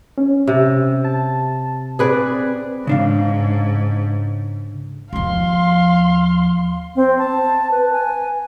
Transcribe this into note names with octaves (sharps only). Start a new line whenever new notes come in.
C#4
C3
A5
C4 G#4 B4 D5
G#2 C#3 D4 F5
D#2 F3 F5 C6
C4
A5
B4
G#5